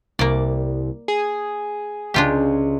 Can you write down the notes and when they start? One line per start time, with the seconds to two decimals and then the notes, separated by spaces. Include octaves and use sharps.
0.19 C2 A#3 D5
1.08 G#4
2.14 C#2 D4 F4 G4